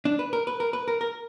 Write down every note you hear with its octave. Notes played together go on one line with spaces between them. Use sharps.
D4
B4
A#4
B4
A#4
B4
A#4
A#4